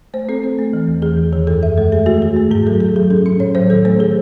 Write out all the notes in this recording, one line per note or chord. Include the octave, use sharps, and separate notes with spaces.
A3 C5
C4 A4
C4
A3
E3
E2
E3 G#4
E2
D#3 G#4
F#2 A4
F#2 E5
G#3 A4
A3 G#4
A3 F#4
D#3 G#4
A3
G#2 G#4
F#3 A4
G#2 G#4
F#3 G#4
C#4 A4
C#4
A2 C#5
F#3 C5
D#3 A4
A3 C5
D#3 G#4